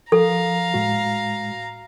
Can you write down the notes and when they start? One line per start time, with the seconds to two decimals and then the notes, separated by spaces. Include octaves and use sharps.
0.12 F3 A4 F5 A#5
0.74 A2 G#3 F#4